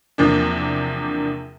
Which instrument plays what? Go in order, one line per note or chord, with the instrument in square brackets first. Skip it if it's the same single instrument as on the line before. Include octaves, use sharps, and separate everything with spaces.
[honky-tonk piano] E2 C3 F3 A#3 D4